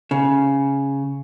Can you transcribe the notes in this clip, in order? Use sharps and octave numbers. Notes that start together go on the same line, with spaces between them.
C#3